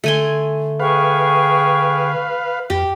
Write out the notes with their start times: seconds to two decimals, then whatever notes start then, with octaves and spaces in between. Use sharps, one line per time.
0.04 D3 A3 G#5 C6
0.80 G#4 B4 F5 G5 C#6
2.70 F2 G4